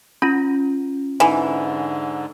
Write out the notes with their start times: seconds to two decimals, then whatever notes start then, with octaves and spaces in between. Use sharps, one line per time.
0.22 C#4 F4 B5
1.20 G#2 D3 E3 D#4 G#5